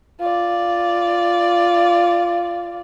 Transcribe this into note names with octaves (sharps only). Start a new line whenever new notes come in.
F4 D5